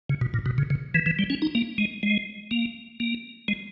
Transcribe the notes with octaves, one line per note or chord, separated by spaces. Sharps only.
C#3
B2
A#2
B2
C#3
C#3
E3
E3
G3
C#4
D#4
A#3
G#3
G#3
A#3
A#3
G#3